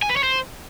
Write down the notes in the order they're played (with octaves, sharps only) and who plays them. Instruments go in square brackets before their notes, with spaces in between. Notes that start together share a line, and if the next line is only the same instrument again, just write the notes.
[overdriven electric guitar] G#5
B4
C#5
C5